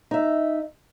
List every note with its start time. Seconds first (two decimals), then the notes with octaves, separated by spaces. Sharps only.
0.11 D#4 E5